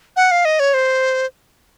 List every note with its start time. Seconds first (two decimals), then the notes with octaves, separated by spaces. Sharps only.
0.16 F#5
0.31 F5
0.45 D#5
0.60 C#5
0.74 C5